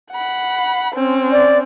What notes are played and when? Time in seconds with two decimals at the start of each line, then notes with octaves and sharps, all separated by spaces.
0.11 F#5 B5
0.95 C4 C#4
1.32 D5